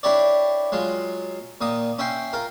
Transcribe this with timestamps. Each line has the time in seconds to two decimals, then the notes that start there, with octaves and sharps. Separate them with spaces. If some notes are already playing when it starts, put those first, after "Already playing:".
0.03 D4 E4 G4 C#5 D5
0.72 F#3 G#3 F4
1.61 A#2 D#3 D#6
1.99 C#4 E5 G5 C6
2.33 F4 A#4